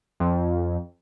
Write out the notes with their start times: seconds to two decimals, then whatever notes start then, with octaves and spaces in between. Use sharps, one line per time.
0.20 F2